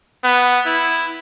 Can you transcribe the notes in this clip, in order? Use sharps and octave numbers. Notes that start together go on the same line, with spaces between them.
B3
E4